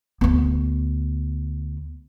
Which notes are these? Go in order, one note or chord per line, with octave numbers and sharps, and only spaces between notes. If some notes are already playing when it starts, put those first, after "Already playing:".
D2 B3